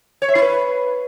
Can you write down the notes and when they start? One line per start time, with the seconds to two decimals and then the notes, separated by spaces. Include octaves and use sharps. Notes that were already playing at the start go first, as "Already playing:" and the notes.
0.22 C#5
0.28 E5
0.35 E4
0.42 B4